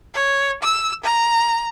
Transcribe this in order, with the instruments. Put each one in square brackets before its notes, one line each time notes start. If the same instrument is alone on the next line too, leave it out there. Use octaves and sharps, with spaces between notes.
[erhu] C#5
E6
A#5